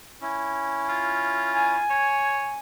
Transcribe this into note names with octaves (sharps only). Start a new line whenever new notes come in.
C#4 E4
F4
G#5
C#5